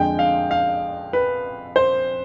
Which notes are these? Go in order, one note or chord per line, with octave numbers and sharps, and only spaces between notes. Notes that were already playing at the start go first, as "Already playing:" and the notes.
Already playing: F2 D3 G#3 G5
F5
F5
B4
C5